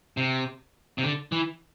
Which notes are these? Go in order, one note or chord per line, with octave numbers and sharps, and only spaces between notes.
C3
C3
D3
E3